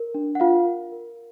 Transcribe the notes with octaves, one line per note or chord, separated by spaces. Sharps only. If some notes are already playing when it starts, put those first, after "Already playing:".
Already playing: A#4
D4
F#5
F4 A#4 F5
A#4
A#4